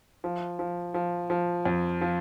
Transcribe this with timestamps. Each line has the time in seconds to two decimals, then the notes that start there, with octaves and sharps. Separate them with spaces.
0.24 F3
0.59 F3
0.94 F3
1.30 F3
1.66 F2
2.01 F3